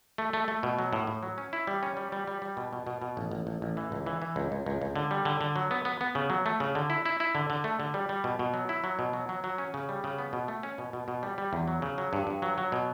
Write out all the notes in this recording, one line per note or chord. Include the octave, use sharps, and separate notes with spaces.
A3
A3
A3
B2
F#3
A2
A2
F#3
C#4
E4
G3
C#4
G3
G3
G3
G3
B2
B2
B2
B2
A1
A1
A1
A1
E3
C#2
E3
E3
C#2
C#2
C#2
C#2
D3
G3
D3
D3
F#3
B3
B3
B3
C#3
F#3
A3
C#3
D3
E4
E4
E4
D3
D3
A3
D3
G3
G3
B2
B2
F#3
E4
F#3
B2
F#3
F#3
F#3
C#4
C#3
G3
C#3
B3
B2
A3
C#4
B2
B2
B2
G3
G3
E2
F#3
C#3
F#3
G2
G2
F#3
F#3
B2